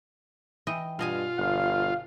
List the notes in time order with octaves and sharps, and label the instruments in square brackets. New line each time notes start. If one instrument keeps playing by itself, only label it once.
[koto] E3 D#5 G5
[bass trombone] G2 [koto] B2 D#5 G#5 [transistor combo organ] F4
[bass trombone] G1 [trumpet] F5